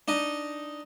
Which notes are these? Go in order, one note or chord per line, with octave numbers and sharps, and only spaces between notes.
D4 D#4 D#5